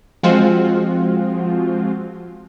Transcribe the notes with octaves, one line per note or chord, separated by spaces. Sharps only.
F3 G#3 C4 F4 F#4